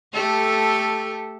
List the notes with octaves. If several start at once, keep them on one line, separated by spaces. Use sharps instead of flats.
A3 G4 A4